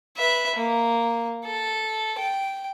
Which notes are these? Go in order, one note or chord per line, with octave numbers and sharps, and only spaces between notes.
B4 E5
A#3
A4
G5